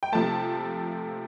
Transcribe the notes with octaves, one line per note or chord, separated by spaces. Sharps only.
G5
C3 F3 A3 A5